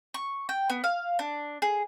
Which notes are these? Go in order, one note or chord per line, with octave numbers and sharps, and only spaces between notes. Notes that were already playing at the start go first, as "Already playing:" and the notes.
C#6
G5
B3
F5
D4
G#4